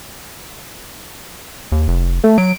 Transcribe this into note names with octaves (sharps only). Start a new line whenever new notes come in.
D#2
F1
A3
F#3 D7